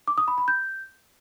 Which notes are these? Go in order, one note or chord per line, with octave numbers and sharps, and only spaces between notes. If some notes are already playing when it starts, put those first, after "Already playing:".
D6
D#6
B5
B5
G6